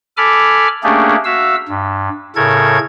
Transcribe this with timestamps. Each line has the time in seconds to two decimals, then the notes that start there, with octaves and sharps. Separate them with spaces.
0.17 A4 G#5 B5 D6 F6
0.84 A3 A#3 C#4 D4 G4 G#4
1.25 F#4 E5 F5 E6
1.68 G2
2.36 A2 C#3 A4 A#4 G#6